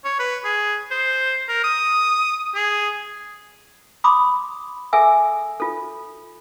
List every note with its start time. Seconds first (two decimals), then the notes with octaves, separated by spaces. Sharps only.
0.05 C#5
0.19 B4
0.44 G#4
0.91 C5
1.48 A#4
1.64 D#6
2.55 G#4
4.04 B5 C6 D6 D#6
4.93 G#4 A4 E5 G#5 E6
5.60 F4 A4